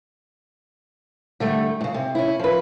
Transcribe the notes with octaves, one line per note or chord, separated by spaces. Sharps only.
D3 G3 A3
A2 C#3
C3
C#4 E4
F3 B4